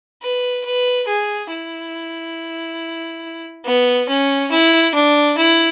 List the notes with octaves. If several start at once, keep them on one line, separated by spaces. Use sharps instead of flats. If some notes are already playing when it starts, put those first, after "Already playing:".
B4
B4
G#4
E4
B3
C#4
E4
D4
E4